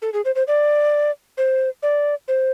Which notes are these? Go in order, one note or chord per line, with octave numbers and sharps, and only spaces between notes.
A4
G#4
C5
C5
D5
C5
D5
C5